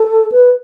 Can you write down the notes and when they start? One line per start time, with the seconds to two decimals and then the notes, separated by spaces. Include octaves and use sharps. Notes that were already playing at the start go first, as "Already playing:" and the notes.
Already playing: A4
0.32 B4